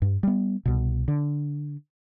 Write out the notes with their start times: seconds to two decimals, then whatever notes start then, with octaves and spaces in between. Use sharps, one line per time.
0.02 G2
0.23 G3 B3
0.65 C2 B2
1.08 D3